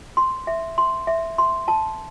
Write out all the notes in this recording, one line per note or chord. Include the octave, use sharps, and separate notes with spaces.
C6
E5
C6
E5
C6
A5